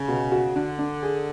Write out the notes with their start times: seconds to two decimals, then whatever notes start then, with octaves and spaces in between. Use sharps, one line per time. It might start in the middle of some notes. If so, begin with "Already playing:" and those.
Already playing: C#3
0.08 B2
0.32 F#4
0.55 D3 D4
0.79 D4
1.03 G#4